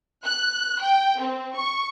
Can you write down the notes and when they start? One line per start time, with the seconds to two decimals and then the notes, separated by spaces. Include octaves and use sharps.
0.25 F#6
0.81 G5
1.19 C4
1.56 C#6